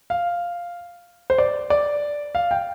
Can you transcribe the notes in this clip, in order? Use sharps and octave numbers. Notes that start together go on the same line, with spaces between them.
F5
C5
D5
D5
F5
G5